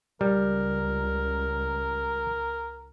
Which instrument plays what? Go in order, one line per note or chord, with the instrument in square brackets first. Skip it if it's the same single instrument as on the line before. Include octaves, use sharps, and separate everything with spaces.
[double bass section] C#2 [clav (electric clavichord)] G3 [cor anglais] A#4